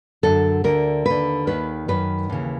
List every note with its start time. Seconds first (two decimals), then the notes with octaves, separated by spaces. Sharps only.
0.23 F#2 D3 A4
0.64 D2 D3 A#4
1.06 D#2 D3 B4
1.47 D#2 D#3 B4
1.88 F#2 D#3 B4
2.30 D#2 C#3 E3